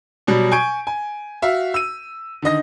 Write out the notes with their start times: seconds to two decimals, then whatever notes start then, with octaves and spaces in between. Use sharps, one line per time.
0.27 B2 F#3 G3
0.52 G#5 C#6 G6 G#6 D7
0.87 G#5
1.42 F#4 E5 F5
1.74 E6 D#7
2.42 D3 D#3 D#5 A#6